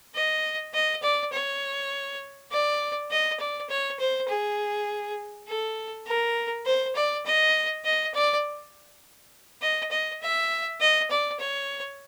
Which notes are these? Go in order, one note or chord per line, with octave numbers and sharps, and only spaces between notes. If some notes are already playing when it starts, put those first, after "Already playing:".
D#5
D#5
D5
C#5
D5
D#5
D5
C#5
C5
G#4
A4
A#4
C5
D5
D#5
D#5
D5
D#5
D#5
E5
D#5
D5
C#5